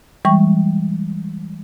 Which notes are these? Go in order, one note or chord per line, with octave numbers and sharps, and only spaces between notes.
E3 G3 G#3 G5 C#6